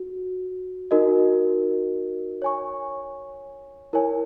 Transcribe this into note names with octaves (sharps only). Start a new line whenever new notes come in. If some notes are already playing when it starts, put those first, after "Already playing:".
Already playing: F#4
D#4 F#4 A#4 D#5
C#5 G#5 C#6
E4 A#4 C#5 G#5